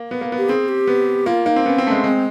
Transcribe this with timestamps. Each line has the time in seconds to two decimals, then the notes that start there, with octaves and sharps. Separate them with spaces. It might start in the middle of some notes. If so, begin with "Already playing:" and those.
Already playing: A#3
0.11 B3
0.21 A#3
0.32 B3
0.38 G4
0.49 C4 G#4
0.68 G4
0.87 B3
1.26 A#3 F4
1.46 A#3 D#4
1.56 C4
1.65 B3 C#4
1.78 C4
1.84 A3 C#4
1.91 G#3
2.04 G#3 C4